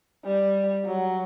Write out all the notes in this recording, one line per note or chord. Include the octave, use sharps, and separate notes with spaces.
G3
F#3